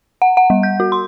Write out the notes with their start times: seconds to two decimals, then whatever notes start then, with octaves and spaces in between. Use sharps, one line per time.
0.22 F#5
0.37 F#5
0.50 G3
0.63 G6
0.80 F#4
0.92 C6